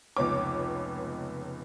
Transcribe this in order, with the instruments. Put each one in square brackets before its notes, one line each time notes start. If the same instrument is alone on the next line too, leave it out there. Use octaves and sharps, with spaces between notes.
[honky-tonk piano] F1 C#2 B3 C#5 D6